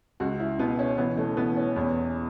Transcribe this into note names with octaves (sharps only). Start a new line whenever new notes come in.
C#2 F#4
E4
B2 B3
C#4
E3 B3
A3
E3 B3
C#4
E2